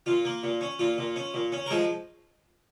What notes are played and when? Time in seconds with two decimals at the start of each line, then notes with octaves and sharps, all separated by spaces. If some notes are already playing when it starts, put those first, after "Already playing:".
0.06 A#2 F4
0.25 A#3
0.43 A#2
0.61 C#4
0.79 A#2 F4
0.98 A#2
1.16 C#4
1.34 A#2
1.52 C#4
1.66 A#4
1.71 F3 G#3 G#4